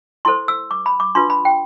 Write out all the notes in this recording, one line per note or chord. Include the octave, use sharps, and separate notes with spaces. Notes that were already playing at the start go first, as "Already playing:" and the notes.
E4 A4 C5 C6
E6
D6
B5
D6
D4 F4 B4 C6
B5
G5